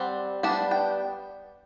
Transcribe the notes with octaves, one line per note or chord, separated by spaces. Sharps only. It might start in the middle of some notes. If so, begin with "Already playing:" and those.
Already playing: G3 C4 F#5
G3 B3 D4 A5
G5